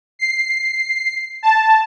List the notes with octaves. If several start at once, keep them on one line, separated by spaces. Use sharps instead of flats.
C7
A5